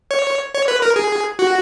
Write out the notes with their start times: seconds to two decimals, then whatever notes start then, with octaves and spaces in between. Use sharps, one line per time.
0.11 C#5
0.54 C#5
0.68 B4
0.82 A#4
0.96 G#4
1.39 F#4